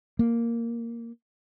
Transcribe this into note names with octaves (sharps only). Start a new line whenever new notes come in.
A#3